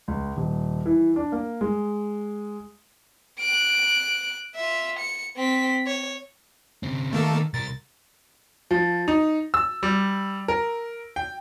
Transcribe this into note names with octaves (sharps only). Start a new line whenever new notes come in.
C#2
D#1
E3
D4
A#3
G#3
F#6 D7
F4 E5
C#7
C4 B6
C#5
C#3 C4
D#3 A3 A#3 A4
C2 A#4 A6
F3
D#4
E6
G3
A#4
G5